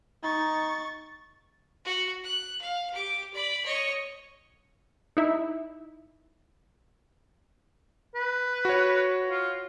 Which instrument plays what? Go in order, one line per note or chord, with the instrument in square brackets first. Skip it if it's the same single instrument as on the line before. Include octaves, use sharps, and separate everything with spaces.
[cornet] D#4 [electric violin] C#6 A6
[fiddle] F#4
F#6
F5
G4 D6
D5 B5
C#5 D#5
[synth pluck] D#4 E4
[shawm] B4
[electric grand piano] F#4 C#5
[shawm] F4